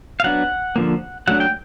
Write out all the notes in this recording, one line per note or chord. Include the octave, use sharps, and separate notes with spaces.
F5
F#3 B3 D4 F#5
D3 F3 A#3
F#3 A3 D4 F#5
G5